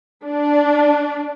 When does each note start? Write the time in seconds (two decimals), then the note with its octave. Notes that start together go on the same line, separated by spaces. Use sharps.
0.25 D4